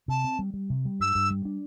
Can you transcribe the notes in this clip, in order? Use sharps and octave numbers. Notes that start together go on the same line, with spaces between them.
C3 A5
C4
G3
G3
C3
G3
G2 E6
G2
G3
D4